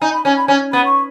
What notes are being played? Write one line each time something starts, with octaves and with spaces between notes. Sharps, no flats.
D#4 G#5
B5
C#4 G#5
B5
C#4 G#5
B3 B5
C#6